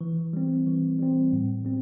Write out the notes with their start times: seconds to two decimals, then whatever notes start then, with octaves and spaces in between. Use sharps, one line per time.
0.01 E3
0.33 G3 C4
0.67 E3
0.99 G3 C4
1.32 A2
1.65 G3 C4